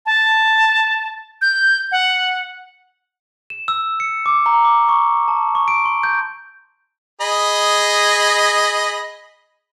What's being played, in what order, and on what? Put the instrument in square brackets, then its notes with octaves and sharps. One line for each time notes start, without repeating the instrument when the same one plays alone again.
[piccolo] A5
G6
F#5
[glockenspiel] E7
E6
C#7
D6
A#5
D6
C#6
A5
C#6
D7
C6
G6
[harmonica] G#4 D#5 B5